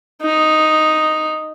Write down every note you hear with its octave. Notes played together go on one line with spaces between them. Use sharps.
D#4